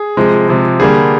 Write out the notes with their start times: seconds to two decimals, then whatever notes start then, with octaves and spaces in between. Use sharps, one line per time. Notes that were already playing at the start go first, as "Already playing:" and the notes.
Already playing: G#4
0.17 C3 F3 G#3
0.48 C3 F3 G#3
0.80 D3 G3 A#3 G#4